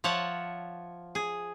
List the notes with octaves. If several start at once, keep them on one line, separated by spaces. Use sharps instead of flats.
F3 C#5 E5 F#5 A5
G#4